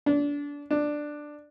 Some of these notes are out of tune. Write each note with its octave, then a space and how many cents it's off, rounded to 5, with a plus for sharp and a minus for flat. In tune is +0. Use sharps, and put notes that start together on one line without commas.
D4 -25
D4 +10